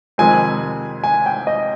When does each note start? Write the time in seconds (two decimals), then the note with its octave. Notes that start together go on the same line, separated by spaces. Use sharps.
0.18 F2 C3 D#3 G#3 C4 G#5
1.04 G#5
1.26 G5
1.47 D#5